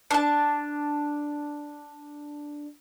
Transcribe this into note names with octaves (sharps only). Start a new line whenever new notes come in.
D4 A5